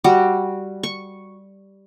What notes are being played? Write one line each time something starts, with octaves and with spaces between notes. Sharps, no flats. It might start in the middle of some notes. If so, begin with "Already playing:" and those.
G3 F#4
C#6